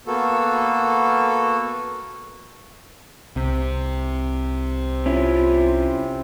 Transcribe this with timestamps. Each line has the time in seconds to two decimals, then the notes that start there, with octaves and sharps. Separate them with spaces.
0.07 A#3 B3 F#4 A4
3.36 C2 C3
5.06 C#4 E4 F4